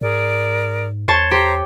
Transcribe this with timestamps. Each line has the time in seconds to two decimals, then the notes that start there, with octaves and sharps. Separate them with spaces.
0.01 G#2 G#4 A#4 D5
1.08 E2 C5 C#5 A5
1.31 G4 C5 C#5 A#5